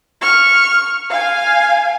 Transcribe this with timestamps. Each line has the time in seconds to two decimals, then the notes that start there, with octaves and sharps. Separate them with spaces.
0.21 C#6 F6
1.10 F5 G#5